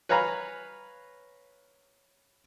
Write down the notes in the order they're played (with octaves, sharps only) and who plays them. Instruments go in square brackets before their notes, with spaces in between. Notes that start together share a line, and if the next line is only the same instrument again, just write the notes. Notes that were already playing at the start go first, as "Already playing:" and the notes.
[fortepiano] B4 C#5 F5 G#5 A#5 B5